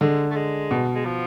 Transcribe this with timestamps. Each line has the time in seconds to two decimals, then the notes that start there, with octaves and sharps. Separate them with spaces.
0.01 D3 G#3
0.30 A3
0.36 G#3
0.71 B2
0.95 G#3
1.05 F3